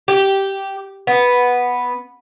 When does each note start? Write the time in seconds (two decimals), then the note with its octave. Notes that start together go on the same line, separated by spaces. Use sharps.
0.08 G4
1.07 B3